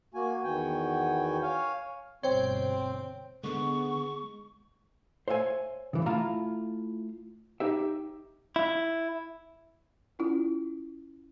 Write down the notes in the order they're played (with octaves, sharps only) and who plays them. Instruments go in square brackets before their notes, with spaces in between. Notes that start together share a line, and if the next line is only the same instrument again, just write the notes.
[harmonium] A#3 F#4 G#5
E2 D#3 B3 F#4 G5 G#5
C#5 F5 G#5
[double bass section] G1 D2 B2 [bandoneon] C4 [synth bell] C5 G5 [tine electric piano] C#5
[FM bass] D3 [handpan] G#3 [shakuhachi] B3 [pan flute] C#6
[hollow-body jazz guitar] C5 C#5 E5 F5 G#5
C#3 E3
A3 E4 F4 F5 A5 A#5
D#4 G4 E5
[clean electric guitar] E4
[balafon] C#4 E4 F4